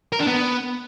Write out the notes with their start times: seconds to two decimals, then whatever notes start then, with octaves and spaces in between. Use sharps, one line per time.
0.13 A#4
0.20 D4
0.27 B3